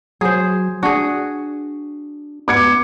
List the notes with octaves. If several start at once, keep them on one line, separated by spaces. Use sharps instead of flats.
F#3 G#4 C5
D4 F#4 G#4
B3 D6 G#6 C#7